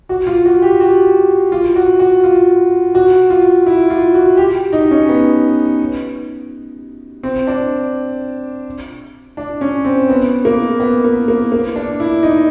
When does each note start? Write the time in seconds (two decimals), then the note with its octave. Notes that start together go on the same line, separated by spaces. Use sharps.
0.09 F#4
0.27 F4
0.45 F#4
0.62 G4
0.80 F#4
1.52 F4
1.76 F#4
1.99 F#4
2.24 F4
2.95 F#4
3.30 F4
3.67 E4
3.90 F4
4.14 F#4
4.37 G4
4.73 D#4
4.91 C#4
5.09 B3
7.23 C4
7.47 D4
9.37 D4
9.61 C#4
9.85 C4
10.09 B3
10.45 A#3
10.80 B3
11.04 A#3
11.28 A#3
11.52 A#3
11.76 D4
12.00 E4
12.23 D#4